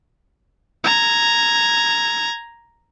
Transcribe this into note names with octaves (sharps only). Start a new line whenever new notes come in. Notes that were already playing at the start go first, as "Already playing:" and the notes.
A#5 G#6